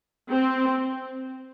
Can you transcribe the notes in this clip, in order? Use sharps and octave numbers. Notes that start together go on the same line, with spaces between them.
C4